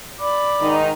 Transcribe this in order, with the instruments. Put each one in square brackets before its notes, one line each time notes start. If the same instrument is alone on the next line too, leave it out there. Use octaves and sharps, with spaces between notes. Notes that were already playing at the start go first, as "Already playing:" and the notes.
[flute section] D5 B5 D6
[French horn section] G#2 D#3 D#4